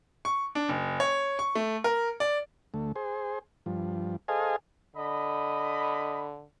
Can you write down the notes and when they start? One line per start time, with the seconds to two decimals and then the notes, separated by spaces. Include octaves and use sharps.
0.25 C#6
0.55 D4
0.69 F#1
1.00 C#5
1.39 C#6
1.55 A3
1.84 A#4
2.20 D5
2.74 D2 A3
2.96 G#4 C5
3.66 G2 F3
4.28 G#4 A4 C5 D#5 F5 G#5
4.96 D3 D#5 B5